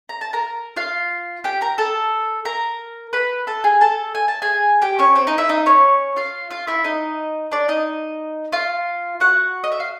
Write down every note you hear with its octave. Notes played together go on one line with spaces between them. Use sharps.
A#5
A5
A#4 A#5
F4 F5
G4 G5
A#4 A#5
A4 A5
A#4 A#5
B4 B5
A4 A5
G#4 G#5
A4 A5
G#5
A5
G#4 G#5
G4 G5
C#4 C#5
C4 C5
D#4 D#5
E4 E5
D#4 D#5
C#4 C#5
F4 F5
F4 F5
E4 E5
D#4 D#5
D4 D5
D#4 D#5
F4 F5
F#4 F#5
D#5
E5
F5